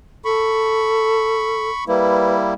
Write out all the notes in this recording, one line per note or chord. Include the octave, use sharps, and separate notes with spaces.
A4 B5 C#6
G3 A#3 E4 B4